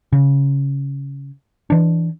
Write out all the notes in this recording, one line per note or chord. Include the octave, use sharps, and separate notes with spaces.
C#3
E3 D4